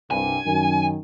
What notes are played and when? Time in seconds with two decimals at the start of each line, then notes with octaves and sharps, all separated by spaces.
0.11 C2 G2 G#5
0.46 F#2 D#3